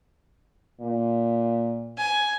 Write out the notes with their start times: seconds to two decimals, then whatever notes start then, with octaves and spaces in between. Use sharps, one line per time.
0.81 A#2
1.98 G#5